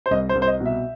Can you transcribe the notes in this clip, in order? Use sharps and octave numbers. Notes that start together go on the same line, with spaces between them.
C5
C2 D#5
C5
C2
C5
D#5
B2
E5